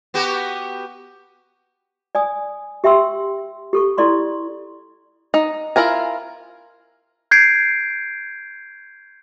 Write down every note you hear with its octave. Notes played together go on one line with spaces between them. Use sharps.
B3 F#4 G4
D5 G#5 D#6
G4 E5 G5 C6 E6
G4 A4 C#6
E4 A4 D5 C6 C#6
D#4
E4 F4 A#4 G#5
G6 G#6 C7 D7